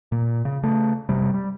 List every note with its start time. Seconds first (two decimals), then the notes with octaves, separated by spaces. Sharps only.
0.12 A#2
0.45 C#3
0.63 C#3 A3
1.09 F#1 C3 G3
1.34 G3